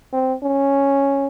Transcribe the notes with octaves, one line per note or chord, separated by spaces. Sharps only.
C4
C#4